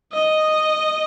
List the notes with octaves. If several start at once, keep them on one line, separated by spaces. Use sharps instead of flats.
D#5